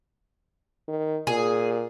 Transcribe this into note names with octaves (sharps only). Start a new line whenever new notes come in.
D#3
A#2 G#4